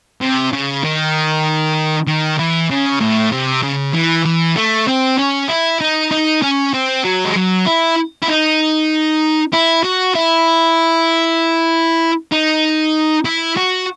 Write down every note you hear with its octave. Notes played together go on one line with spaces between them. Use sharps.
C3
C#3
D#3
D#3
E3
C#3
A2
C3
C#3
E3
E3
A3
C4
C#4
E4
D#4
D#4
C#4
C4
F#3
G#3
F#3
E4
E4
D#4
E4
F#4
E4
D#4
E4
F#4